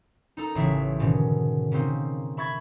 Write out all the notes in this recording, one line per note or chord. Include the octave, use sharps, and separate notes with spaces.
D#4 A4 A#5
A1 C#3 G#4 E5
G#2 B2 D3 D#3 C#4
C#3 A#3 C4 D#4
E5 B5 C#6 G#6 A6